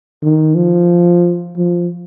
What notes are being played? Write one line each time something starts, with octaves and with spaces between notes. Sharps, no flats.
D#3
F3
F3